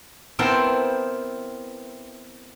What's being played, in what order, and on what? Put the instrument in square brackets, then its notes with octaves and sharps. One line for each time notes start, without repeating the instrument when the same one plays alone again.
[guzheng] B3 C4 E4 A#4 G5 A5